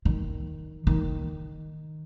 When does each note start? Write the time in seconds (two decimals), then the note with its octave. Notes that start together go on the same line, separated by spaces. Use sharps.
0.05 D#3
0.87 D#3